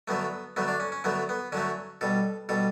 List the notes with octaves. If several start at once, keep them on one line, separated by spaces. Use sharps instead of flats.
D3 F#3 A3 B3
D3 F#3 A3 B3
D4
C#4
C#4
D3 F#3 A3 B3
B3
D3 F#3 A3 C#4
B2 G3 A4
B2 G3 A4